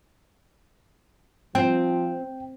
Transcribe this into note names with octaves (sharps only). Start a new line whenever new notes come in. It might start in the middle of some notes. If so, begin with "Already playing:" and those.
F3 C4 G5